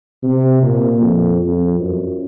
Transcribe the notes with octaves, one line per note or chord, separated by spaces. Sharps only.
C3
A#2
F2
F2
F#2